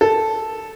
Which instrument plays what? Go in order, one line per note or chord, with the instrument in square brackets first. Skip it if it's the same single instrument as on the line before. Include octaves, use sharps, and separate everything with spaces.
[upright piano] A4